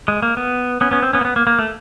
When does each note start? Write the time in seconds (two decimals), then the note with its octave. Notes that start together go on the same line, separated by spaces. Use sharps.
0.08 G#3
0.22 A#3
0.37 B3
0.81 B3 C#4
0.91 B3 C#4
1.02 C4
1.13 B3 C#4
1.21 A#3
1.25 B3
1.36 A#3
1.47 A#3
1.59 A3